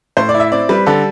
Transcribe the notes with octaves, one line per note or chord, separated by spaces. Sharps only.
A2 C5
D5
E4
E5
C4 D5
G3 B4
D3 A4